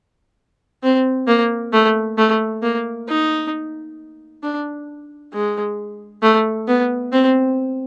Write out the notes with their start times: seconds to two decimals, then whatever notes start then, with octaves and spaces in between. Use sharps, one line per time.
0.83 C4
1.27 A#3
1.73 A3
2.18 A3
2.63 A#3
3.08 D#4
4.43 D4
5.33 G#3
6.22 A3
6.68 B3
7.13 C4